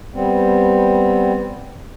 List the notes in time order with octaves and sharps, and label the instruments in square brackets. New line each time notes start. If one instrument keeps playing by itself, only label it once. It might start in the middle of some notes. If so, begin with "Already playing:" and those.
[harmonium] G3 B3 C4